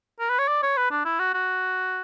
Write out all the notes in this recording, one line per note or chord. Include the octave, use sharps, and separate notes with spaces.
A#4
B4
C#5
D5
C#5
B4
D4
E4
F#4
F#4